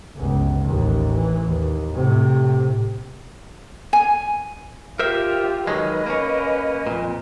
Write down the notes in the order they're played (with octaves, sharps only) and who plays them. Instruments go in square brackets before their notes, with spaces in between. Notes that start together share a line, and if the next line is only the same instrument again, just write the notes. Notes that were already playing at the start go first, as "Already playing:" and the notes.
[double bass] G1 C#2
A1 D#2
E3
D#2
A2 C3
[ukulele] G#5
[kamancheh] F4 G4 [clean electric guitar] A#4 C5 E5
[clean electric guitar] D#3 F#3 G#3 [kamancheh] B4 D#5
[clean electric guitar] A#3 C#4
F2 A#2